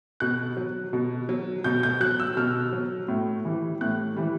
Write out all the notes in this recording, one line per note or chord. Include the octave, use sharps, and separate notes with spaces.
B2 F#6
F#3
B2
F#3
B2 G6
G6
F#3 F#6
E6
B2 F6
F#3
A2
E3 G3
A2 F#6
E3 G3